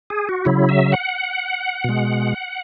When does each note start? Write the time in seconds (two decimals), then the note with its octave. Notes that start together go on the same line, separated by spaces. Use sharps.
0.10 G#4
0.29 F#4
0.45 C#3 F#3 E4
0.69 E5
0.92 F#5
1.84 B2 G#3